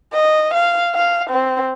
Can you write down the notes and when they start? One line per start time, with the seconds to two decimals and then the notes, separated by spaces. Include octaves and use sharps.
0.13 D#5
0.54 F5
0.95 F5
1.30 C4